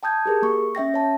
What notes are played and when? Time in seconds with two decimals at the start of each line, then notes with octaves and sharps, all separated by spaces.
0.03 G5 A5 D#6 G6 G#6
0.26 G4 G#4 A#4
0.42 A#3 C#6
0.75 C#4 E5 G5 A#6
0.94 C#5 A5